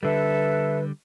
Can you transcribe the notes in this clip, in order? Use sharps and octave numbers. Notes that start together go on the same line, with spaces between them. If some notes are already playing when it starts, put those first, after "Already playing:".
D3 G3 A4 B4 E5